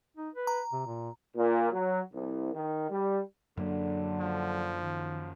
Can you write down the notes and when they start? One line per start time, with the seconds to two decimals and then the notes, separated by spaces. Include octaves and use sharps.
0.17 D#4
0.35 B4
0.47 A#5
0.73 C3
0.86 A#2
1.36 A#2
1.72 F#3
2.14 C2
2.54 D#3
2.90 G3
3.57 F#2 D3 F#3 A#3
4.21 F3
4.82 D#3